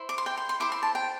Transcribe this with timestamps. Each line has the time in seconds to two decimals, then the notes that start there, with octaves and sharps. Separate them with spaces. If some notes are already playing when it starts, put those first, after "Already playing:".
Already playing: E4 C5
0.09 D6
0.18 C6
0.26 G5
0.37 C6
0.49 C6
0.60 E4 C5 D6
0.72 C6
0.83 A5
0.95 G5